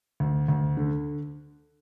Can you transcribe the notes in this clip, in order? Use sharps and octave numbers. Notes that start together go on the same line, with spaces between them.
D2
D2
D3